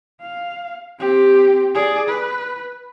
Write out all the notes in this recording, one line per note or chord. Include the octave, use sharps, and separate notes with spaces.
F5
C4 G4
G#4 D5
B4